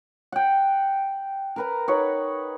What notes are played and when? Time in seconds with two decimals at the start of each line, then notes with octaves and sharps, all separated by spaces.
0.32 F#5 G5
1.56 A#4 B4 A#5
1.88 D#4 B4 C#5 F#5